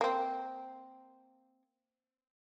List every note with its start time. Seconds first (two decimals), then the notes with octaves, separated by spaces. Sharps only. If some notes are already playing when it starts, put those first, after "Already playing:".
0.01 A#3 C4